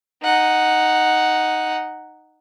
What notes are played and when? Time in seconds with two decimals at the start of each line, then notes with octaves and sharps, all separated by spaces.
0.23 D#4 F#5